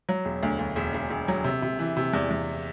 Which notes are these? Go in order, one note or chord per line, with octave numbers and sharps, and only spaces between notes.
F#3
E1
D2
D2
E1
E1
E1
F#3
C3
C3
E3
C3
E2
E2